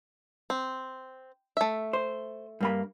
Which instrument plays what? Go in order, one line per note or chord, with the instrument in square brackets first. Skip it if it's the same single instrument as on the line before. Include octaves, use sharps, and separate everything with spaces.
[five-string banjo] C4
A3 E5
[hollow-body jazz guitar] C5
G2 A#3 B5